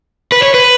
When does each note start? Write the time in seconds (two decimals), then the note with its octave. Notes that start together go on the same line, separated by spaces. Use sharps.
0.32 B4
0.42 C#5
0.54 B4